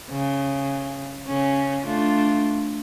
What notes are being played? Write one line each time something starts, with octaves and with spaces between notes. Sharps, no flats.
C#3
C#3 C#4
A3 D4 F4